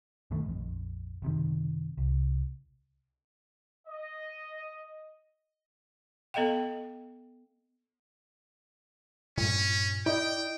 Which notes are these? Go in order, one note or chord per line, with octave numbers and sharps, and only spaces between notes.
G2 B2 D#3 A3
A#1 F2
F#1 C3 D#3
C2
D#5
B3 A4 D#5 F5 G5
G2 A#2 C#4
E4 D5 D#5 G5